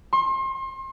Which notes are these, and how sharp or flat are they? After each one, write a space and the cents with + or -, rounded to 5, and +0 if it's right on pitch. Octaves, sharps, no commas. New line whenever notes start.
C6 +35